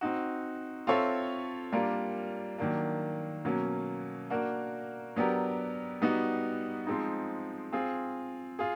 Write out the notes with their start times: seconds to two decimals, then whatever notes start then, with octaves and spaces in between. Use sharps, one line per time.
0.01 C4 D#4 F#4
0.87 C4 F4 A4 C#5 E5
1.72 G3 A#3 D4 F4 A#4
2.58 D#3 F#3 A#3 D4
3.45 B2 F#3 A#3 C#4
4.30 A#3 D4 F#4 A#4
5.16 F#3 B3 D4 G4 A#4
6.02 G3 B3 D#4 F#4
6.87 F3 G#3 C4 D#4
7.73 C4 F4 G#4
8.59 F4 G#4